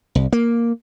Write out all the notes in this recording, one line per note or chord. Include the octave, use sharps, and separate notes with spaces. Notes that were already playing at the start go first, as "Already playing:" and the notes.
C2
A#3